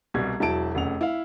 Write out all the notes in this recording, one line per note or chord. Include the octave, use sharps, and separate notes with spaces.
C2 B2 G3 G#6
E1 F#3 E4 A5 D7
F1 C#3 F#5 F7
E4 F5